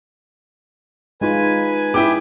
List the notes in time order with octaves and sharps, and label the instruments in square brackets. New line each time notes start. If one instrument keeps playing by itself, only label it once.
[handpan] G#3 D#4 F4 [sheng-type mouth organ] B4 G#5
[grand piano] E4 G5 D6 [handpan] G#4